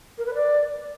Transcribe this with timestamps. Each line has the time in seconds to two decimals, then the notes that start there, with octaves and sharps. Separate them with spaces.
0.18 A#4
0.26 B4
0.34 D5